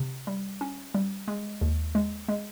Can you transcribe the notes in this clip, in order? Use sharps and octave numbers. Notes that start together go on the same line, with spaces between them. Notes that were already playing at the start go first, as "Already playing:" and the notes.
Already playing: C3
G3
C#4
G3
G#3
D#2
G#3
G#3